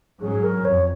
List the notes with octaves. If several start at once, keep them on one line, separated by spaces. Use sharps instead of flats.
G#2 F#3 C#4 G#4
A#4
F2 C#5